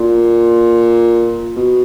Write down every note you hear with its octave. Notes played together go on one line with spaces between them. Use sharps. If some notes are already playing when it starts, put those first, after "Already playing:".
Already playing: A#2
B2